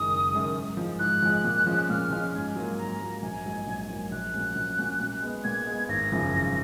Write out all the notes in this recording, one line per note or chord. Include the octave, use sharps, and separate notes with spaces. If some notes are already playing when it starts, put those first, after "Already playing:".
Already playing: F#1 F#2 D#3 G#3 D#6
F#1
F#2 D#3 G#3
G#2
F3 G#3
G#2 F#6
F3 G#3
A#2
F3 G#3 C#4
A#2 F6
F3 G#3 C#4
G#2 G#5
F#3 A#3 F4
G#2 A#5
F#3 A#3 F4
A#1 G#5
G#2 F#3 A#3 D#4
A#1
G#2 F#3 A#3 D#4
A#1 F#6
A#2 F#3 C#4
A#1
A#2 F#3 C#4
A#2
G#3 B3
A#2 G#6
G#3
B3
G#1 A#6
F#2 C#3 F3
G#1